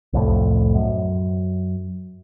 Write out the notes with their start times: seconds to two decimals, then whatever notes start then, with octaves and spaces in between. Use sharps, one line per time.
0.13 C2 F2 A2
0.75 F#2